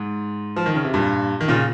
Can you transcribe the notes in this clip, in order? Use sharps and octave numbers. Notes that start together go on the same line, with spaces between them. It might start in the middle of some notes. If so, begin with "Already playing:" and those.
Already playing: G#2
F3
D#3
C#3
C3
G2 A#2
D#3
A#2 C#3